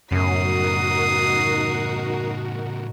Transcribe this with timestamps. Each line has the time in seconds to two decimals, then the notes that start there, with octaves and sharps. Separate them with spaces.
0.12 F#2 A2 C#3 D#4 F#4 A#4 D#6 C7